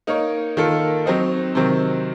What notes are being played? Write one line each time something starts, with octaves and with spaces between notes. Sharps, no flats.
A#3 D#4 A#4 C#5
D#3 A#3 F4 A4
F#3 C4 D#4
C3 D#3 F#3 C4